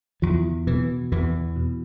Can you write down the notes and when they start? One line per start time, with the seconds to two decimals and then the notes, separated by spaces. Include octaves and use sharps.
0.22 E2 F3
0.67 B2 E3
1.12 E2 E3
1.56 B2